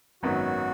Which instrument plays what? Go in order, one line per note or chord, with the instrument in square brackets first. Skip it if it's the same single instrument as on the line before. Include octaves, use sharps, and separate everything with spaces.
[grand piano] G#1 F#2 D#3 F#3 B3 [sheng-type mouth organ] F#4